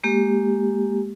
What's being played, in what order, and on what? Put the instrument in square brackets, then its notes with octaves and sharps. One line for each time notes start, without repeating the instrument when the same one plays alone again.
[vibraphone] G#3 A#3 G4